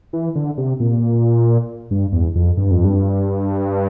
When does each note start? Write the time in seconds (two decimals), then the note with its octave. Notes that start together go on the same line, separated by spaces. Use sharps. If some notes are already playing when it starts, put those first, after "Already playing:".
0.13 E3
0.35 D3
0.58 C3
0.80 A#2
1.91 G2
2.13 E2
2.35 F2
2.57 G2
2.71 F2
2.85 G2